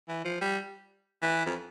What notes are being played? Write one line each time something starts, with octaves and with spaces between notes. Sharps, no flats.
E3
F3
G3
E3
F2